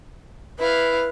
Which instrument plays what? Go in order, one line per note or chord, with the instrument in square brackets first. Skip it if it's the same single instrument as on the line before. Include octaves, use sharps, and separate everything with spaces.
[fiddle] E4 F5 [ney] B4